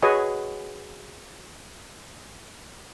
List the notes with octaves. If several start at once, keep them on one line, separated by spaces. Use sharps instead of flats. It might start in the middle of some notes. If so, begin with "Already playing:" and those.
F#4 G#4 B4 C#5 D#5 G#5